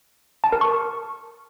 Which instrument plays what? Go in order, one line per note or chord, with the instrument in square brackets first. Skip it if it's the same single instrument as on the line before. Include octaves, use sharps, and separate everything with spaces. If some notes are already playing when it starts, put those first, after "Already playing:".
[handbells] A5
A#4
C#6